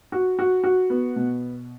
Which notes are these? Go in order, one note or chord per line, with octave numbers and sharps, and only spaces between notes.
F#4
F#4
F#4
B3
B2